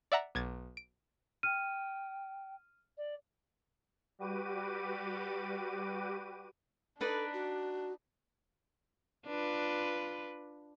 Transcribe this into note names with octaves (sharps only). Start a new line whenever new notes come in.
D5 E5 F#5 A#5
B1 G#6 A6
D7
G5 F6 D#7
D5
G3 F#4 G4 B4 D6 D#7
D4 D#4 A4 B4 D5
F#4
D4 F4 B4